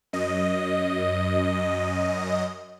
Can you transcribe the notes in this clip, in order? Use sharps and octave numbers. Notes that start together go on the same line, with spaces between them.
F#2 D#5